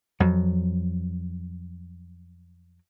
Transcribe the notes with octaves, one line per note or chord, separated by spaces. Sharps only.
F2 F#3